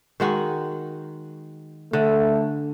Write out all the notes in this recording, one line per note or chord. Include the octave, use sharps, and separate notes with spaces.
D#3 G#3 F#4
D3 A3